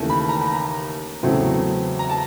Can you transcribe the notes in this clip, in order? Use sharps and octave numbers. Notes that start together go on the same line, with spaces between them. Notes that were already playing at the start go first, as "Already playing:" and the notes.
Already playing: D#2 C#3 E3 A3
B5
A#5
B5
A#5
E2 C#3 F#3 A3 C4
A#5
A5